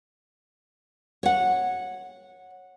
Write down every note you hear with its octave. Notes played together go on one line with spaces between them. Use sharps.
C#5 F#5